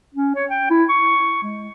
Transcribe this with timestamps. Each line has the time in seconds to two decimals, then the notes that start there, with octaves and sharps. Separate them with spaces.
0.14 C#4
0.35 C#5
0.50 G5
0.70 E4
0.89 C#6
1.43 G#3